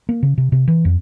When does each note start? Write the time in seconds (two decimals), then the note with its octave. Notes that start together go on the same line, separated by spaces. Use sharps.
0.09 A#3
0.23 C#3
0.38 C3
0.52 C3
0.68 E3
0.85 F2